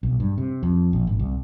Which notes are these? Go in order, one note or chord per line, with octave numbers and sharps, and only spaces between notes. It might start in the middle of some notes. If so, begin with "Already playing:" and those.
B1
G2
C3
F2
A#1
G#1
C2